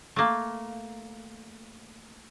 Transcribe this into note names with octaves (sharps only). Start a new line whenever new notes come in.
A3 A#3